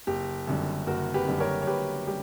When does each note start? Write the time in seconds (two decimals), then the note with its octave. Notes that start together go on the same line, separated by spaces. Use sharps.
0.07 F#1 G4
0.47 F#2 D3 G3
0.87 F#1 F#4 A#4
1.14 G4 B4
1.27 F#2 D3 G3
1.40 A#4 C#5
1.62 C#5
1.67 F#1 G4 B4
2.07 G3 G4